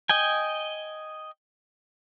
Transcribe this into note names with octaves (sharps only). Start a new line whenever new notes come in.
D#5 G5 G#5